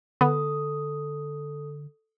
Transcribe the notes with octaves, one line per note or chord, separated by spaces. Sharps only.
D3 B3 A4 D#6